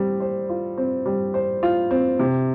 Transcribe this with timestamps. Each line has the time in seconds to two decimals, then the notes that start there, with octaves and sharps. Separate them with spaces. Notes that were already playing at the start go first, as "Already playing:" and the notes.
Already playing: G3 C4
0.20 C5
0.49 F4
0.78 C4
1.06 G3
1.34 C5
1.63 F4
1.91 C4
2.19 C3